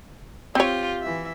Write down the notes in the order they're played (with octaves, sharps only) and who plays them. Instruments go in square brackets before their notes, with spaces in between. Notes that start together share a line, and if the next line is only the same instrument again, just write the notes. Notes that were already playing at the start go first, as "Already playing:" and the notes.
[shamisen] C4 C#5 [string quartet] F4 G4
[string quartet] E3 E5